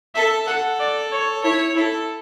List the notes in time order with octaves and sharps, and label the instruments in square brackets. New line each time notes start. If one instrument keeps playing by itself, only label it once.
[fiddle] A4 [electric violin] E5
[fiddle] A4 [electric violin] F#5
[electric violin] D5
C#5
[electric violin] E4 [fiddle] C#5
[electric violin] E4 [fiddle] A4